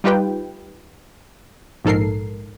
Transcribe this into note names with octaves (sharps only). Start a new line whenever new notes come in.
G3 D#4 F4 G4 B4 G5
A#1 G#2 A4 A#4 C7